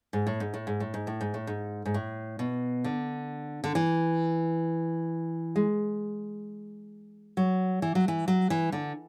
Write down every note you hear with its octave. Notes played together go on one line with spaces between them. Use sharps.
G#2
A2
G#2
A2
G#2
A2
G#2
A2
G#2
A2
G#2
G#2
A2
B2
D3
D3
E3
G#3
F#3
E3
F#3
E3
F#3
E3
D3